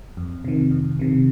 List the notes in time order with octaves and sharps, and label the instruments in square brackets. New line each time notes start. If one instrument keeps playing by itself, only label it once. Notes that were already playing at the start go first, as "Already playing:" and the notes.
[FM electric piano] F2
C3 D#3
F2
C3 D#3